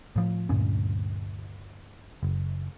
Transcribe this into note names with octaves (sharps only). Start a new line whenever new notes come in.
A2 F3
D2 G2 A#2 C#4
F#1